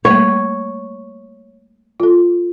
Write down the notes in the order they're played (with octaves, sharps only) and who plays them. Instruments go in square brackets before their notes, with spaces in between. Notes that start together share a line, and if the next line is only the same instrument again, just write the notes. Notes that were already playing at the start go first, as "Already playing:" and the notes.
[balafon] G3 A3 A#3 [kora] C#5
[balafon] F4 A4